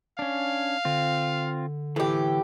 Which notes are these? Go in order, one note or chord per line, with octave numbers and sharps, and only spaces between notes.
C#4 D4 F5
D3 C4 F4
A2 E3 G4